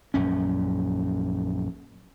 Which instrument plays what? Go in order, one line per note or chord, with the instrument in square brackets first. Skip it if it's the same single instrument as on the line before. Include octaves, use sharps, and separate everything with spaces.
[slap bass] A#1 F#2 C#4